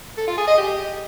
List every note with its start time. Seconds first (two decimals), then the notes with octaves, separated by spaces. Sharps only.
0.18 A4
0.28 F4
0.38 G#4
0.48 D#5
0.58 G4